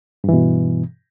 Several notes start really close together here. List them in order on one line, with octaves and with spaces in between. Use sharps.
G2 E3 B2